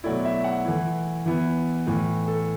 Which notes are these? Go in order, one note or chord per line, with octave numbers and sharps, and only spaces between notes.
B2 F#3 A3 E4 D5
E5
F#5
E3 A3 E4
E3 B3 E4
A2 E3 A3
A4